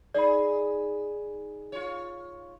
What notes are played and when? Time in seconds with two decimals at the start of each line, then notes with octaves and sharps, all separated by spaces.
0.14 D#4 G#4 D5 B5
1.72 F4 C#5